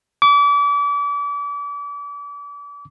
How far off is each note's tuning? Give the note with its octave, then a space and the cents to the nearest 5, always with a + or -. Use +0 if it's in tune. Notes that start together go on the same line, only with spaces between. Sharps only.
D6 -35